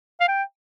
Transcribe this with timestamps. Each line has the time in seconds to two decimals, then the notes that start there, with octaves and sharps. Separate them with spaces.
0.21 F5
0.28 G5